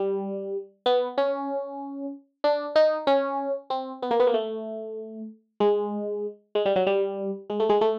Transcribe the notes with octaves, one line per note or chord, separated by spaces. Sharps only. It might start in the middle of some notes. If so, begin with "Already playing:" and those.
Already playing: G3
B3
C#4
D4
D#4
C#4
C4
B3
A#3
B3
A#3
A3
G#3
G#3
G3
F#3
G3
G#3
A3
G#3
A3